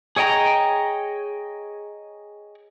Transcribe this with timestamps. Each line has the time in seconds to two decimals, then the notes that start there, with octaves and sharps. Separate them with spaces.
0.16 G#4 C#5 D#5 G5 A#5